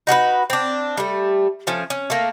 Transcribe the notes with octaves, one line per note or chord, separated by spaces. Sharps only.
D#4 F#4 A#4 B4
C4 D4
G3 A3
F3 A3 C#4
C#4
A3 A#3